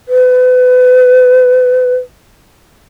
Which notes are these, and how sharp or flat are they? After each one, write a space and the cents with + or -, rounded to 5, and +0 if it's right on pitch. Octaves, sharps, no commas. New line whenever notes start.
B4 +35